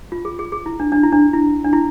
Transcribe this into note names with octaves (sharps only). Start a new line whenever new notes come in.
F4
G#4
G#4
G#4
E4
D4
D4
E4
D4
E4
D4
E4